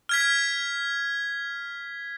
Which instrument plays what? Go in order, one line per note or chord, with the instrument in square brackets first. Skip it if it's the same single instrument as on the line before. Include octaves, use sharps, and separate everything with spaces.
[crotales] F6 G#6 B6